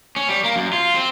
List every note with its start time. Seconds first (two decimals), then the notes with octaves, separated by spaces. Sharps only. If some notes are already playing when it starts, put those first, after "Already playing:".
0.16 C#4
0.29 G3
0.44 A#3
0.56 F#2
0.73 F4
0.95 C4